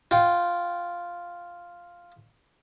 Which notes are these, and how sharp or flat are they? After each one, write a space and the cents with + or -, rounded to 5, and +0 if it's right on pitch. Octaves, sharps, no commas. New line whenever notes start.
F4 +0 G5 -15